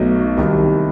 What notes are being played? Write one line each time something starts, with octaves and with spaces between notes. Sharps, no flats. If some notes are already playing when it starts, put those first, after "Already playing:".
Already playing: B1 B2 F#3 A3 D#4
C2 C3 D#3